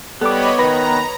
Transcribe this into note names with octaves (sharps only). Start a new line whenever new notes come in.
G3 B3 A4 C#5 D#5 B5 D6
D#3 B4 A#5 B5 A#6